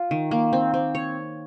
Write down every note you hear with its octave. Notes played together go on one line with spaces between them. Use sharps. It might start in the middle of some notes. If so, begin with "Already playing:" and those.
Already playing: F4
D#3
A#3
C4
C4
C#5